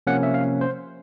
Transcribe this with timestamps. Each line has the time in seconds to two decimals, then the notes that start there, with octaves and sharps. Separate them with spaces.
0.07 C3 F3 A#3 C#4 F#5
0.23 E5
0.34 F5
0.61 C5